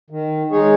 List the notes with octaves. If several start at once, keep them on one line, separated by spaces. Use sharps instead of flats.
D#3
G#3 D#4 G#4 C#5